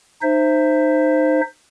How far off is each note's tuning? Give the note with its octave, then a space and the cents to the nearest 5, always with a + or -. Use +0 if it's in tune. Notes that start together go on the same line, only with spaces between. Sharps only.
D#4 -25 C5 +0 E5 +10